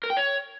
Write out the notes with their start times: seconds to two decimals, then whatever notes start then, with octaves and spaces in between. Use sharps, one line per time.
0.04 A#4
0.10 G5
0.17 C#5